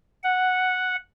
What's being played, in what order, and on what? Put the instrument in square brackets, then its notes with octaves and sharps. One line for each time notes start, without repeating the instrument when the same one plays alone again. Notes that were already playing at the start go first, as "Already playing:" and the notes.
[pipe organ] F#5